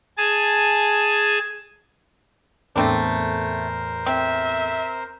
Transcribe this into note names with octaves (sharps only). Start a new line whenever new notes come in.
G#4 G#5 A5
E2 A2 A3 C4 D4 A#4 C5 B5
C4 E5